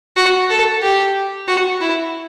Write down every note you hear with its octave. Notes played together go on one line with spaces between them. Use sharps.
F#4
A4
G4
F#4
E4